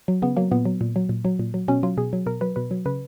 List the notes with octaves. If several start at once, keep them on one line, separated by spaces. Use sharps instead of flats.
F#3
C#3 B3
F#3 A#3
A#2 B3
F#3
A#2
F#3
A#2
F#3
A#2
F#3
B2 C#4
F#3 F4
B2 G#4
F#3
B2 A#4
F#3 B4
B2 B4
F#3
C#3 B4